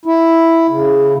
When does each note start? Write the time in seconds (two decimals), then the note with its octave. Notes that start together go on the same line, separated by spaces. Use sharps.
0.05 E4
0.69 C#3